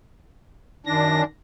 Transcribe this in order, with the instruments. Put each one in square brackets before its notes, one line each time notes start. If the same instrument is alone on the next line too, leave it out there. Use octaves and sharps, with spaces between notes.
[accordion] F#2 D4 [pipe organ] D#3 A#6